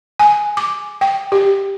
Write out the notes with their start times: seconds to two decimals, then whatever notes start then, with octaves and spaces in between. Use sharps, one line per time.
0.20 G#5
0.57 D6
1.01 G5
1.32 G4